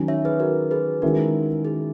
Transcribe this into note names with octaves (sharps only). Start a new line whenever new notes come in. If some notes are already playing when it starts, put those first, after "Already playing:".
Already playing: D#3 F#3 C#4
C#5 E5
G#4 B4
F#4 A#4
G#4 B4
D#3 G#3 C#4 E4 F#4 A#4
G#4